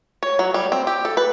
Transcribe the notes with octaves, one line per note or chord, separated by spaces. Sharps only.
C#5
F#3
G3
C4
G4
A4
B4